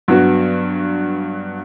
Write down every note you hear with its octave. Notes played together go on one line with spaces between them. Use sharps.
G2 F#3 B3 F#4